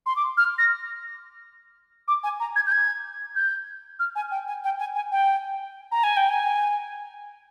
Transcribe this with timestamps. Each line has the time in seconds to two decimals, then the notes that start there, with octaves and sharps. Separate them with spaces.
0.06 C6
0.16 D6
0.37 F6
0.58 A#6
2.08 D6
2.23 G#5
2.40 A#5
2.56 G#6
2.67 G6
2.72 G#6
3.36 G6
3.99 F6
4.16 G#5
4.31 G5
4.47 G#5
4.64 G5
4.79 G#5
4.95 G#5
5.12 G5
5.92 A#5
6.04 G#5
6.17 G5
6.29 G#5